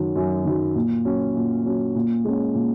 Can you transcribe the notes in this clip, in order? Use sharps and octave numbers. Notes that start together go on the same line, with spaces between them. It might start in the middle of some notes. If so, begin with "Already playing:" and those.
Already playing: F#2 D#3 F#3
F#2
D#3 F#3
A#2
F#3 C#4
A#2
F#3 C#4
A#2
G#3 C#4
A#2